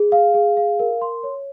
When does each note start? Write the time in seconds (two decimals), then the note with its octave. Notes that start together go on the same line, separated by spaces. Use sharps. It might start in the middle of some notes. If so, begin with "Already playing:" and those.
Already playing: G#4
0.12 F5
0.34 G#4
0.57 F5
0.79 A#4
1.02 C6
1.23 C#5